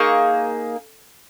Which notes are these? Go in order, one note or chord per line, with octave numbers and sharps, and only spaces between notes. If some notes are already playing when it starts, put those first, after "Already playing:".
Already playing: A#3 D#4 G#4 C#6